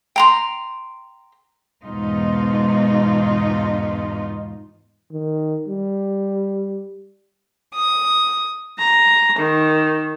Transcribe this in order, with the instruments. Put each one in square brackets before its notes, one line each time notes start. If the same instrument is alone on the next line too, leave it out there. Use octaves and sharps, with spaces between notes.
[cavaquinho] G5 A#5 C6
[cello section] E2 G#2 B2 D#4 F4
[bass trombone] D#3
G3
[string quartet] D#6
A#5
D#3